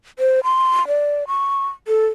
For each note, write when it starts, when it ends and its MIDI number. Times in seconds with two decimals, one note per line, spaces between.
0.19 0.40 72
0.44 0.87 84
0.88 1.27 74
1.27 1.67 85
1.88 2.06 69